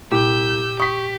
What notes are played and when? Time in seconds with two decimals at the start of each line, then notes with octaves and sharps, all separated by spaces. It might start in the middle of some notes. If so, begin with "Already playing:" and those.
0.11 C2 A#2 G4 E6 G6
0.80 G4 C#6 D#6 B6